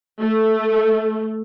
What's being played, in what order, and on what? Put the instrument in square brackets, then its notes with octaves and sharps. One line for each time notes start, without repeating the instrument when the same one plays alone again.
[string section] A3